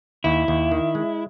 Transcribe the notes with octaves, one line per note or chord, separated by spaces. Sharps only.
D#2 E4
D#2
D#3
G#3